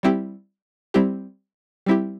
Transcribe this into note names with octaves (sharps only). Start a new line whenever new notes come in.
G3 C4 E4 G4
G3 C4 E4 G4
G3 C4 E4 G4